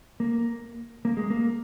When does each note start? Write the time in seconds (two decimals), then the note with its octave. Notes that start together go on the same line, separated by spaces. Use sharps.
0.20 A#3
1.05 A#3
1.17 G#3
1.30 A#3